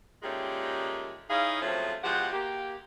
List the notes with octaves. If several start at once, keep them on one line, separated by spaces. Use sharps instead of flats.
A#2 D#3 G#3 A3 C#4 G4
D#4 E4 G#4 C#5 F5
F3 F#3 G#3 A3 C4 C#4
B2 F3 G#3 G4 F#5
A#3 G4